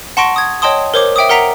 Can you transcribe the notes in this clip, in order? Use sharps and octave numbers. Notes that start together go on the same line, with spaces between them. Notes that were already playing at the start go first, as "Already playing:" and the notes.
F#5 A5 C6 C#6 A#6 D7
D#6 G#6
C#5 D#5 G5 A5 C6 D#6
A#4 C5 C#5 D6
E5 G5 D6 D#6
A#4 F#5 A#5 B6 D7 F7